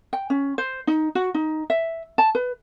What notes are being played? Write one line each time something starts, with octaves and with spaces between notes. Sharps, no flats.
G5
C#4
C5
D#4
F#4
D#4
E5
A5
B4